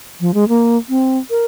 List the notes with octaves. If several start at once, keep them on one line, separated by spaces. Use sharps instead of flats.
F3
G#3
A#3
C4
A#4